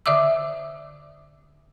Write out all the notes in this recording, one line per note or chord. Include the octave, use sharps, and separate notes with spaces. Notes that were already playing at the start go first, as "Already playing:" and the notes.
D3 D5 E5 D6 E6